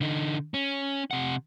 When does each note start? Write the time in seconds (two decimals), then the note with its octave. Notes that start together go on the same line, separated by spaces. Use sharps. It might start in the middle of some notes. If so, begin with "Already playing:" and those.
0.01 D3 D#4
0.54 C#4
1.11 C3 F#5